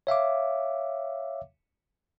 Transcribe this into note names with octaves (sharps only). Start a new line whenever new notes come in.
C#5 E5 F5 D6